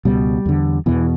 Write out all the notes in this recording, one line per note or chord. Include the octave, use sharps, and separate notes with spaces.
C#2 B2 G3
E2 D3
E2 B2 E3